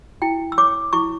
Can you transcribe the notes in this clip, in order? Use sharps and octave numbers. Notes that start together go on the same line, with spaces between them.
E4 G5
E6
C#5 D6
E4 C#6